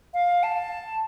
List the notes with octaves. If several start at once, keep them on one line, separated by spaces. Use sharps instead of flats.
F5
A5